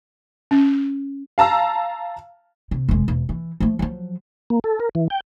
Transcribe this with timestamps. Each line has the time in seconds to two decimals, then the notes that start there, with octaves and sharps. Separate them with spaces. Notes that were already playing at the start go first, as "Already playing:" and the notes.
0.51 C#4
1.38 F5 A5 A#5 E6
2.71 C3
2.89 F1 G#3
3.08 E1
3.29 E3
3.60 F3 A3
3.79 F3 F#3
4.50 A#3
4.64 A4
4.80 A#4
4.95 E3
5.10 G5